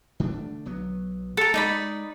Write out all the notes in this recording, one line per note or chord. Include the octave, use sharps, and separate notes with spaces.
D3 A3 D4
B1 F#3 B3
A4 A#4
G#3 D#4 D5 B5